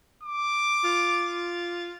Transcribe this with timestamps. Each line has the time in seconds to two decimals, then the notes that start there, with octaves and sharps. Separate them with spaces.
0.23 D6
0.84 F4